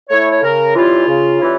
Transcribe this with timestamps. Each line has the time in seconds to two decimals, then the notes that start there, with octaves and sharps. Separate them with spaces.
0.09 A3 E4 C#5
0.30 C#5
0.42 C#3 A#4
0.75 E3 G3 C#4 E4 F4
1.08 C#3
1.39 E3 G3 C#4 E4